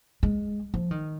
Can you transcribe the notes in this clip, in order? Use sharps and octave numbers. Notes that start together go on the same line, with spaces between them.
G#3
F3
D#3